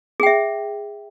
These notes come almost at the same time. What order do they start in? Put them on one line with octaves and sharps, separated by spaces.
G#4 G5 E5